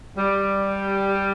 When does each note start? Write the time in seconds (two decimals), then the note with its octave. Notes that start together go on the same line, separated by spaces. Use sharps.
0.17 G3